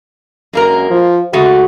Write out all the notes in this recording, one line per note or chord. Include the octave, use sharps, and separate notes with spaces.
F#2 G#3 A#3 A#4
F3
C#3 G#3 A3 F#4